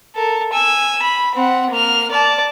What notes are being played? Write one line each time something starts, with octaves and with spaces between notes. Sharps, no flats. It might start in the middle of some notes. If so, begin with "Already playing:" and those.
A4 A#4
G#5 E6
B5
C4 F#5
A#3 F6
D5 A5